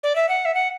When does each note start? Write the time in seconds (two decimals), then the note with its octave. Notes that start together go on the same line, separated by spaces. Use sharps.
0.03 D5
0.16 E5
0.29 F#5
0.45 E5
0.54 F#5